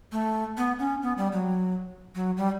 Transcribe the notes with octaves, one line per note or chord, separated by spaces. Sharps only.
A3
B3
C#4
B3
G3
F#3
F#3
G3